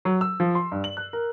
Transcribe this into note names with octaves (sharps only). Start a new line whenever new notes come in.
F#3
E6
F3
C6
G2
F#7
F#6
A#4